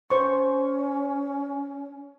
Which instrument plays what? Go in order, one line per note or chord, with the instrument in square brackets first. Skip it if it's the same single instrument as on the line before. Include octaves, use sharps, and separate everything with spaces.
[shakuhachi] C#4 [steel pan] C5 C#6